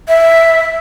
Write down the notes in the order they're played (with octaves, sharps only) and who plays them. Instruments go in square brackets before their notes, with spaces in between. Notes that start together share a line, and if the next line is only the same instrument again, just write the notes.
[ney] E5